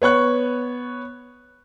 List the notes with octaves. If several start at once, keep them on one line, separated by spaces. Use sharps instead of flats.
B3 C#5 C#6 F#6